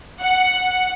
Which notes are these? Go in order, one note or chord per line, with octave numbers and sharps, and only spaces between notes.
F#5